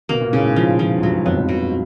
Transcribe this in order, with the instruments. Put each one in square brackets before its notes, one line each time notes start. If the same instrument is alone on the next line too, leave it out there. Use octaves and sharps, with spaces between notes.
[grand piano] B2 [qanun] A#3
[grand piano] A#2
[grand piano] A2 [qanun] C#3
[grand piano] G#2
[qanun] F3
F3
[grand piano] G#2
[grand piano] G2 [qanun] F#3
[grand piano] G#2
[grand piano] F2 [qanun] B3
[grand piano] F2
[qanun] B2